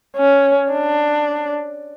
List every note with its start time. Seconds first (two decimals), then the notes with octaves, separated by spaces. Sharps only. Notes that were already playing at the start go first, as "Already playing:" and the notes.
0.17 C#4
0.72 D4